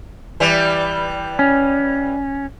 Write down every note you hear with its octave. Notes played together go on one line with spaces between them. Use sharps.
E3 G3
C#4